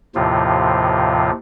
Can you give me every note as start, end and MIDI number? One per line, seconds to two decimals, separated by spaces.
0.15 1.31 39
0.15 1.31 45
0.15 1.31 48
0.15 1.31 53
0.15 1.31 65